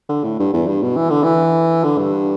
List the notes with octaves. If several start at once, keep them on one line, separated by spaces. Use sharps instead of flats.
D3
A2
G2
E2
G2
B2
E3
D3
E3
D3
G2